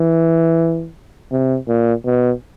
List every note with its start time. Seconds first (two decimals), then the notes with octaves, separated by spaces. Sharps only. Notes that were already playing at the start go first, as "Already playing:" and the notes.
Already playing: E3
1.32 C3
1.68 A#2
2.05 B2